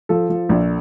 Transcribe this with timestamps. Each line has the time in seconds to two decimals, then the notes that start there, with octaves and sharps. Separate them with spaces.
0.09 F3 A4
0.30 F3
0.49 A#1